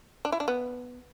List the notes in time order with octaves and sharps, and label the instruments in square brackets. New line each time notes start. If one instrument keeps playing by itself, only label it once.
[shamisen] D4
E4
D4
B3